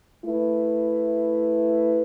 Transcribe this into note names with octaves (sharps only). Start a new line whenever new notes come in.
A3 E4 B4